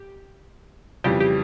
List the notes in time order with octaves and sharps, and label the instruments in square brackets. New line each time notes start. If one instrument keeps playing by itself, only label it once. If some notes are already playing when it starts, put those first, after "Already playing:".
Already playing: [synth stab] G4
[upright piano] F2 C#3 E3 G3 [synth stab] G4
[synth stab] G4